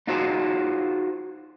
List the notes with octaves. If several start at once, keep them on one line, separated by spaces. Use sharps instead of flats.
D#4 F4 F#4 G#4 C5